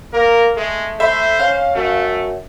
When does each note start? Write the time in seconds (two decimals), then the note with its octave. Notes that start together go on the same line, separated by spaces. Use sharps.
0.13 A#3 A#4
0.56 G#3 A3
1.00 A3 C5 E5 B5
1.40 C#4 F5
1.75 F#2 A3